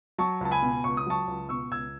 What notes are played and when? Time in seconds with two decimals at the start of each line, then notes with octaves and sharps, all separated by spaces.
0.18 F#3 A5 C#6
0.41 C#2 A5
0.51 G#5 B5
0.62 B2
0.84 C#2 C#6
0.97 D#6
1.06 F#3 A5 C#6
1.28 C#2
1.49 B2 C#6 E6
1.71 C#2 E6 G#6